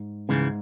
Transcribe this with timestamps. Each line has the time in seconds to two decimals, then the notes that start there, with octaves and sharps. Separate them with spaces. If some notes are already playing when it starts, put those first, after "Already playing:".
Already playing: G#2
0.29 C#2 G#2 C#3 E3